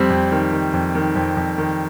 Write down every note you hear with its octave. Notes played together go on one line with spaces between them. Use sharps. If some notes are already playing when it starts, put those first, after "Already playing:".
Already playing: F2 G3 C4
F2
D#3
D#3
F2
D#3
F2
F2
D#3